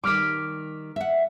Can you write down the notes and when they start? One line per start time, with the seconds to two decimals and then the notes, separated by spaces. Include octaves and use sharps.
0.04 D#3 G3 D6 F6 B6
0.96 E5 F#5